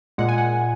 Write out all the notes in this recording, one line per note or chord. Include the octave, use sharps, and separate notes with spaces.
A#2 G#3 F#5
G#5
F#5